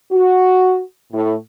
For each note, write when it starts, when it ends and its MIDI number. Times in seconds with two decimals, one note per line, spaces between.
0.11 0.80 66
1.12 1.34 45